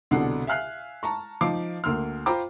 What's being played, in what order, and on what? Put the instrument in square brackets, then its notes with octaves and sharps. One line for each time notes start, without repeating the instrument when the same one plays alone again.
[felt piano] C2 B2 D3 D4 F#5 C7
E5 F5 G#5 F6 F#6 C7
A5 A#5 C#6
F3 D#4 F5 D6 C7
D2 A#3 C6 E6 F6
F4 C5 G5 A#5 B5 D6